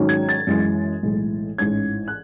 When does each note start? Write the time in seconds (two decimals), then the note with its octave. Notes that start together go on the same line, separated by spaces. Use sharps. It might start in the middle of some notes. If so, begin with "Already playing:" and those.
Already playing: G#2 D#3 F#3 C#4
0.09 G#6
0.29 A6
0.47 F#2 E3 G#3
1.03 B1 A2 E3 G#3
1.58 A1 G#2 E3 G#3 C#4 G#6
2.08 F#6